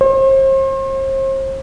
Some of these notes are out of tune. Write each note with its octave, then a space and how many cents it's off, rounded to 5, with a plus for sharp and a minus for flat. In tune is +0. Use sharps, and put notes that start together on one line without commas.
C5 +40